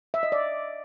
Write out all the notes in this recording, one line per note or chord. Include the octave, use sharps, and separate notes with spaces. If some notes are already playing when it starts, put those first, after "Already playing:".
E5
D#5
D5